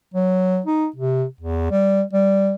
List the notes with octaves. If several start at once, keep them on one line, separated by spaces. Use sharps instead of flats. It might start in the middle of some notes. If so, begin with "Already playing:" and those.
F#3
D#4
C3
E2
G3
G3